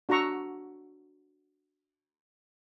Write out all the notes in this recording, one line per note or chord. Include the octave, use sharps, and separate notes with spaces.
D4 F#4 F#5 A#5 C#6 E6